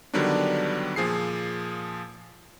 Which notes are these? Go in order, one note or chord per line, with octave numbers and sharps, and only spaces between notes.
D3 D#3 F#3 G3 B3 D4
A#2 F3 G#4 C7